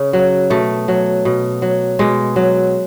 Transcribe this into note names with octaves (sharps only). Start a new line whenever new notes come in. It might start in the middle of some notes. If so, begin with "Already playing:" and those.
Already playing: C#3
F#3
B2 A3
F#3
B2
F#3
B2 G#3
F#3